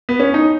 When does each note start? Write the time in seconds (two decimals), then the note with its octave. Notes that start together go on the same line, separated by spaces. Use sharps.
0.09 B3
0.20 C#4
0.34 D#4